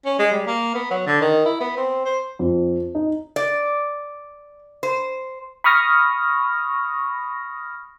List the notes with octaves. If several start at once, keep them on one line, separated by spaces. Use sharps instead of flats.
C#4
G#3
G3
A#3
B3
F#3
D3
D#3
E4
B3
C4
C5
F2
D#4
D5
C5
B5 C#6 D#6 F6 A#6